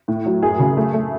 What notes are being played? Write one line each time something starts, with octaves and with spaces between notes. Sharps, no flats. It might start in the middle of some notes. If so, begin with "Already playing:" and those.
A2
F#3
F#2 G#4
C#3
A3
A3